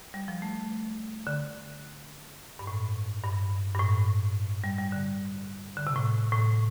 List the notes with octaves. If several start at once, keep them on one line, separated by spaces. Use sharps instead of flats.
G3
F3
A3
D3
G2
A2
G2
G2
A2
G3
G3
D3
D3
C3
A2
A2